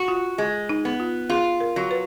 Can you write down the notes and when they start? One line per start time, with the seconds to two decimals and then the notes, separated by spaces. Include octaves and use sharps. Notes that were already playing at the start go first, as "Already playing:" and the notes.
Already playing: F#4
0.08 F4
0.38 G#3
0.69 D#4
0.85 B3
1.00 F4
1.29 F4 G#4
1.61 A#4
1.76 F#3
1.91 B4